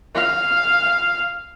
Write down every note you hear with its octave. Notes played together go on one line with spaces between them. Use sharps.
F5